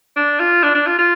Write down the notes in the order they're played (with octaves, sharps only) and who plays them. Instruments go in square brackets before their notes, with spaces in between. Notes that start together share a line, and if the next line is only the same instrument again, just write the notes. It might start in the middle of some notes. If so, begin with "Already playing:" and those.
[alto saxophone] D4
F4
D4
D4
F4
F4